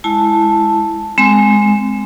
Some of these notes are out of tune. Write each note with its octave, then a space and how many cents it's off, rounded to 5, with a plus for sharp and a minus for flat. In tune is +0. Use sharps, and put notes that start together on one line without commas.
G#3 +0 E4 +0 A5 +0
G#3 +0 C4 -20